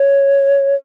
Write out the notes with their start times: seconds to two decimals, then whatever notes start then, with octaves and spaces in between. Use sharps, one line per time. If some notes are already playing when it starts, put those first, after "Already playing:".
Already playing: C#5